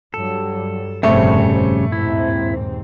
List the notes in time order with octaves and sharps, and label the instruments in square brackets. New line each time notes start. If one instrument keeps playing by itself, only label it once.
[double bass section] G2 F#3 G3 [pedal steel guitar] A4
[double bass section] F1 C4 [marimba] G2 A#2 [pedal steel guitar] C#3 G3 C#5 [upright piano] A3
[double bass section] D#2 G#2 C4 [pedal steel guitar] E4